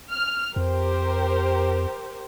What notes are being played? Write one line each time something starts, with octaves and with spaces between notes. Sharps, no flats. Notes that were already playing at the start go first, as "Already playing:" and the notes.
F6
F2 G4 A#4 C5